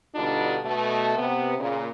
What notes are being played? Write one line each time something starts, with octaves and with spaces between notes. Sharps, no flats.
B2 D3 G3 D4 D#4 F4
B2 A3 F#4
C3 B3
A#2 C#3